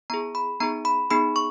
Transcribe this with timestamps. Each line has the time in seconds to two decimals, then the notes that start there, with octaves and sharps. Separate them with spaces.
0.10 B3 E4 G#4 A#5
0.35 B5
0.60 B3 D#4 G#4 A#5
0.85 B5
1.11 B3 D#4 G#4 B5
1.36 C#6